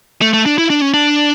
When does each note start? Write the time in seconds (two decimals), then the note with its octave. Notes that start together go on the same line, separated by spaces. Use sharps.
0.22 A3
0.33 A3
0.46 D4
0.58 E4
0.70 D4
0.82 C#4
0.94 D4